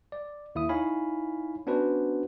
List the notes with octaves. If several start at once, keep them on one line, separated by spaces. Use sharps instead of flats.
D5
D#2 E4 E5 D#6
D#4 E4 C#5 F5 G#5 B5
B3 C#4 D4 F#4 B4 C5